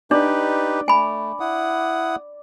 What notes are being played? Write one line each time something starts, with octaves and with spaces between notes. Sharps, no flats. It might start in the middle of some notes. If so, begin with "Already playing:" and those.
D4 D#4 G4 B4 D5
A3 G#5 B5
E4 F#5 D#6